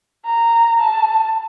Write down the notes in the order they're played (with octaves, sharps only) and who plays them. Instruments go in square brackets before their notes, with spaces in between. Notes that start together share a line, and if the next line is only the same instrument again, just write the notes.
[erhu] A#5
A5